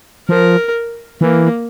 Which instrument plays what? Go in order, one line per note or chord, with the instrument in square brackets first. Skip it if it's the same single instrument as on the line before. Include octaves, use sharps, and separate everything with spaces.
[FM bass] F3 [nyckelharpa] A#4
[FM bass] E3 [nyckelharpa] A#3